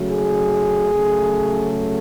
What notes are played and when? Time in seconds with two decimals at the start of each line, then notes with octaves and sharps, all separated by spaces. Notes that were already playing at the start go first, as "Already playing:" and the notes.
Already playing: C#3 F#3 A3
0.10 G#4
0.93 C#3 F#3 A3